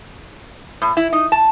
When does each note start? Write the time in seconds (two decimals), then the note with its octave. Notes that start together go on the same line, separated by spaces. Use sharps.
0.82 A2
0.97 E4
1.13 D#4
1.32 A5